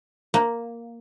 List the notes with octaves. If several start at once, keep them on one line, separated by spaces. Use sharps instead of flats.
A#3